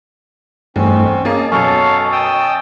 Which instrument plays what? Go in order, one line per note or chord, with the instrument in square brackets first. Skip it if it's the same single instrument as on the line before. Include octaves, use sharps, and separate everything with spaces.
[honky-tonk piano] E2 [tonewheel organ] G2 A3 D#4 [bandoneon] C4 C#4
[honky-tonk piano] A#3 C#4 G#4 [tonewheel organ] D#5 A5
[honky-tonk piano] F#2 B2 [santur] C#4 C#5 [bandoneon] A4 F5
[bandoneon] G5 D#6 E6